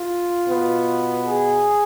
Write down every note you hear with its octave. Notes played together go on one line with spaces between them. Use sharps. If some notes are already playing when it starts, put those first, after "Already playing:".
Already playing: F4
B2 B3
G#4